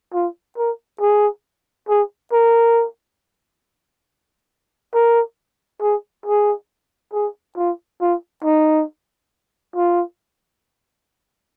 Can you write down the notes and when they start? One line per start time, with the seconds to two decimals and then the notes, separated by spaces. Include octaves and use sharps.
0.14 F4
0.58 A#4
1.01 G#4
1.89 G#4
2.32 A#4
4.94 A#4
5.82 G#4
6.26 G#4
7.13 G#4
7.57 F4
8.01 F4
8.44 D#4
9.76 F4